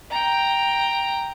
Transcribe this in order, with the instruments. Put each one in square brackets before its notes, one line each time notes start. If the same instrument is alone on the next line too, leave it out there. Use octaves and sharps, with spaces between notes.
[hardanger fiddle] G5 A#5